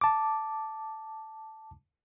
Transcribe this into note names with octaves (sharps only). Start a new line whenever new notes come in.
A5 D6